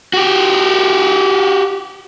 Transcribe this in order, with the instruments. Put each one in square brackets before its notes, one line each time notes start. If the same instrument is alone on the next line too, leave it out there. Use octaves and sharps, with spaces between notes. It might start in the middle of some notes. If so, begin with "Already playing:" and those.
[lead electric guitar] F#4 G4